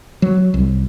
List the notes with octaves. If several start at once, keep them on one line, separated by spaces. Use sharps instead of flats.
F#3
C2